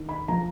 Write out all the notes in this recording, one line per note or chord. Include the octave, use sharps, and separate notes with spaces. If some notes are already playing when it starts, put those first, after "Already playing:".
Already playing: D#3
B5
F3 A#5